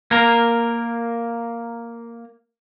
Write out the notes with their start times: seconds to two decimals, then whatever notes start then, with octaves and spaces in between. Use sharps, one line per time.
0.11 A#3 A#4